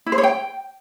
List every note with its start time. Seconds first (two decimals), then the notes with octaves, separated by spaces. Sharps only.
0.06 E4
0.12 C5
0.18 C#5
0.23 G5